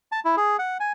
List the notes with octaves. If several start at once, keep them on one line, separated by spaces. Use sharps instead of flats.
A5
E4
G#4
F#5
G#5